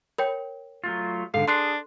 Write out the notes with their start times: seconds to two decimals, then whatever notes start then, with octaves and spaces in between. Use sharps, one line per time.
0.18 A#4 C#5 G5
0.84 F#3 A3 F4
1.34 G#2 D3 A4 F5
1.48 D4 G#4 C6 F#6 C7